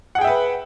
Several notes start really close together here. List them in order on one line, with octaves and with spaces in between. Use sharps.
F#5 G#4 G5 E5 B4